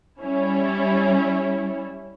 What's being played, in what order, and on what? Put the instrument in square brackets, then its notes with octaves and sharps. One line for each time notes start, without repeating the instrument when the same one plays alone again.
[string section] G3 C#4 E4